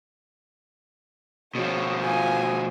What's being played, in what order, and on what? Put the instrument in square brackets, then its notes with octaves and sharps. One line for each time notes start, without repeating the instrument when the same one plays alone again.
[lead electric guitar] B2 F3 [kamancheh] C#5
[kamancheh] F4 G#5